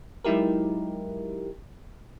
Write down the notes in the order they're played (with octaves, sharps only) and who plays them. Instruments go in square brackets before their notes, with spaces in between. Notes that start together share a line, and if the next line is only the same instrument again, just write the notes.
[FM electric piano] F#3 G#3 D#4 E4 G4 A#4